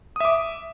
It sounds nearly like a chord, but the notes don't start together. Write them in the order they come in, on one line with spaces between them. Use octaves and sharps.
D#6 E5 D6